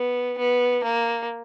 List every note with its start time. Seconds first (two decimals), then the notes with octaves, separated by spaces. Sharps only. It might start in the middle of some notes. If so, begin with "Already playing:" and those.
Already playing: B3
0.38 B3
0.84 A#3